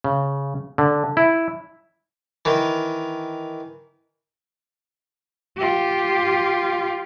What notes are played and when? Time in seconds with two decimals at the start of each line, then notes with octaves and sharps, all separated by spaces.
0.04 C#3
0.78 D3
1.17 E4
2.45 D#3 E3
5.57 F4 G4